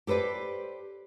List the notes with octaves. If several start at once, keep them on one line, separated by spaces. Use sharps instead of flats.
G4 A4 B4 C5 D5